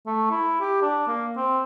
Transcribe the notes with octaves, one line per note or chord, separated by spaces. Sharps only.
A3
E4
G4
D4
A#3
C4